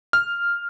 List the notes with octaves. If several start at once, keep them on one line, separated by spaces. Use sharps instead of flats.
F6